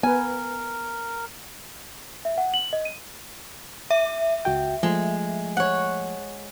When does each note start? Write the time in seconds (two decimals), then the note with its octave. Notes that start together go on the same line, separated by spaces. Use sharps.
0.03 B3 A#4 B4 G#5
2.25 E5
2.38 F#5
2.54 F#7
2.73 D#5
2.85 D#7
3.91 E5
4.45 C#2 F#4 G5
4.83 F3 G#3 A3
5.57 C#5 F#5